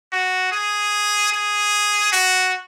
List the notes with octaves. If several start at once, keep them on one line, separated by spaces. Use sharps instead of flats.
F#4
G#4
G#4
F#4